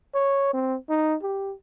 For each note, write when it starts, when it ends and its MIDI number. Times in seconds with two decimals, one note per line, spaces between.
0.14 0.49 73
0.54 0.75 60
0.89 1.15 63
1.22 1.53 67